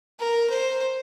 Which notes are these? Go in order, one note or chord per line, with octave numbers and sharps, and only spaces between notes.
A#4
C5